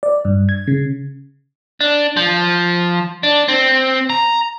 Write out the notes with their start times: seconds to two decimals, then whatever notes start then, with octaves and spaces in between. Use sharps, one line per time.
0.03 D5
0.25 G2
0.49 G#6
0.67 C#3
1.81 D4
2.17 F3
3.23 D4
3.48 C4
4.10 A#5